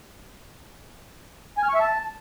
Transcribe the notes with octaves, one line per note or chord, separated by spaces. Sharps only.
G#5
F6
C#6
E5
A5